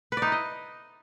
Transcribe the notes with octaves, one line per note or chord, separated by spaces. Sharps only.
B4
D5
D#4
E4
D#5